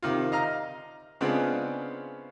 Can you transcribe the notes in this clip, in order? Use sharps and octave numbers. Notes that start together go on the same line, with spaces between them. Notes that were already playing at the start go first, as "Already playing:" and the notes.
C3 D#3 F4
D#5 F5 A#5 F6
C#3 G#3 B3 C4 D4 F4